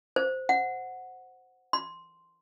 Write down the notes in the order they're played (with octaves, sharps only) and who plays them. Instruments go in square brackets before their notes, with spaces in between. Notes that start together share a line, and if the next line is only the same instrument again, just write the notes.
[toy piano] C5
F#5
C6